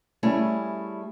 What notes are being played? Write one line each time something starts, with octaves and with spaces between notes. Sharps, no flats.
G3 A3 C#4 E4 G#4